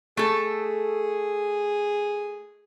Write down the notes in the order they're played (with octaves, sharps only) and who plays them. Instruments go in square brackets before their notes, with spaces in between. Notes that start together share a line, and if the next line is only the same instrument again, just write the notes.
[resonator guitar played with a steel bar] A3 A4 [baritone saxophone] G#4